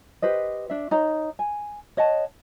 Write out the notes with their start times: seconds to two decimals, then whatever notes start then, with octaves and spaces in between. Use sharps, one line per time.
0.22 G4 B4 C5 D#5
0.70 D4 E5
0.91 D#4 C#5 A#5
1.39 G#5
1.97 C#5 D#5 F#5 A5